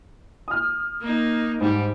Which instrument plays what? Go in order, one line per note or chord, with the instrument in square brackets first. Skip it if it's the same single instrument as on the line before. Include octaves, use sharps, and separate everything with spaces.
[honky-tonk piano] D#6 F6
[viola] A#3 D#4
[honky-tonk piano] G#2 [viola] G3 G4